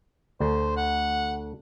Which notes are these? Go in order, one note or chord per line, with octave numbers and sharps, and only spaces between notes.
D2 D3 C5
F#5